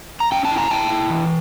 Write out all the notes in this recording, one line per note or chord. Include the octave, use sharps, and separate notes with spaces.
A#5
C#4 G5 A5
G5 A5
E4
G#5 A#5
E4 G5 A5
E4
E3